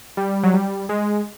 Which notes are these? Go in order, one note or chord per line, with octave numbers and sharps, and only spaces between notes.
G3
F#3
G3
G#3